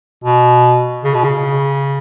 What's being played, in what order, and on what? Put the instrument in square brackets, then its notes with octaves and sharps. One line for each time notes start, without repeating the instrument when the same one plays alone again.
[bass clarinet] B2
C#3
B2
C#3